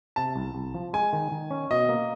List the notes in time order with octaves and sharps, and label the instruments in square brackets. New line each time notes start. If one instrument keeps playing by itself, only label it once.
[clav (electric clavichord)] C3 [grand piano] A5
[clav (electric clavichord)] C2
C2
F3
[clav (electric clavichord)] G#3 [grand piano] G#5
[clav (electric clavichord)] D#3
D#3
C#4
[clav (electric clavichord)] B2 [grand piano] D#5
[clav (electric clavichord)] A#3